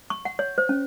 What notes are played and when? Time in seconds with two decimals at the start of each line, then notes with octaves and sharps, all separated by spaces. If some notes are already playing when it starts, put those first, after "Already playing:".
0.10 C#6
0.25 F#5
0.39 C#5
0.58 C5
0.69 C#4